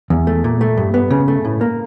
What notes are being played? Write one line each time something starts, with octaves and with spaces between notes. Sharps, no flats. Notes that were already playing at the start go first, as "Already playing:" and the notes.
E2
A3
A#2
A3
G2
B3
C#3
A3
A2
A#3